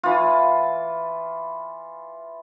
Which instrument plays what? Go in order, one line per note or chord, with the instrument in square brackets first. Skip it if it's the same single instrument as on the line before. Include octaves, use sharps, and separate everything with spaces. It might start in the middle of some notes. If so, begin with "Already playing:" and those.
[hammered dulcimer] E3 F4